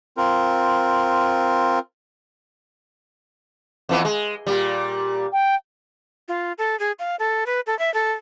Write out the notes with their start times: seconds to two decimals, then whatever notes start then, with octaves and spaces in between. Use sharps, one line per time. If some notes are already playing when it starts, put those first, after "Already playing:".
0.17 C4 F4 A#4
3.89 F2 E3 B3
4.05 G#3
4.47 A#2 G3
5.33 G5
6.28 F4
6.58 A4
6.79 G#4
6.99 F5
7.19 A4
7.46 B4
7.67 A4
7.79 E5
7.94 A4